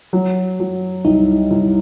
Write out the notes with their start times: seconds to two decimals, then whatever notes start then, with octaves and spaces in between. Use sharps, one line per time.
0.13 F#3
0.60 F#3
1.05 C2 D#4
1.50 C2